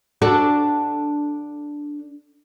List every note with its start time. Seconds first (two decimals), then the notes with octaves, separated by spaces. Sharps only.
0.22 D4 F#4 A4